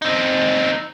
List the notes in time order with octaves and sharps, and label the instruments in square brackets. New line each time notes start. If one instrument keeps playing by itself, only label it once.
[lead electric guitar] C4 D#4